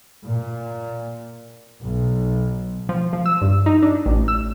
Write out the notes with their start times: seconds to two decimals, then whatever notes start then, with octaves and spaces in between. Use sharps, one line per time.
0.24 A#2
1.83 B1
2.89 F3
3.13 F3
3.26 E6
3.42 G2
3.66 D#4
3.83 D4
4.06 A1
4.28 E6